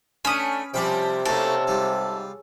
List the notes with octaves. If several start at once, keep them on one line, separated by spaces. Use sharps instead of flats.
A3 C#4 D4 B4 D#6
C3 F3 G3 C4 G4 B4 G5
C#3 A3 A#3 C#4 D#4 F#4 A4
G#2 G3 F4